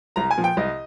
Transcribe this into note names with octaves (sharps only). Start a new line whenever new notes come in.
C2 A#5
G#5
A#2 F3
G5
C2 D#5